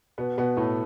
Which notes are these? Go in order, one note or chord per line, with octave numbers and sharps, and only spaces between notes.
B2 B3
B2 B3
A2 A3